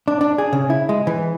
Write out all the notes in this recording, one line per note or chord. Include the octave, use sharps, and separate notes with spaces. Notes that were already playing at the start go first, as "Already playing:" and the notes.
D4
D4
G#4
C#3
E4
G#3
E3